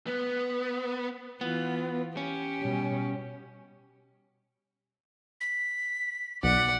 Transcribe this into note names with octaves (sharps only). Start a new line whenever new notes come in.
B3
E3 B3 F4
C#4 G4
B2 G3
B6
B1 D5 F#5